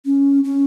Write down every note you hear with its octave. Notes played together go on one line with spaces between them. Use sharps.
C#4
C#4